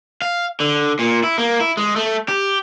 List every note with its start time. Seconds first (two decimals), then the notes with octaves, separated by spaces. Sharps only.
0.22 F5
0.60 D3
0.99 A#2
1.23 E4
1.38 A#3
1.60 E4
1.77 G#3
1.96 A3
2.28 G4